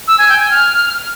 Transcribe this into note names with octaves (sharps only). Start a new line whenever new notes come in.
E6
G#5
G5
G#5
F6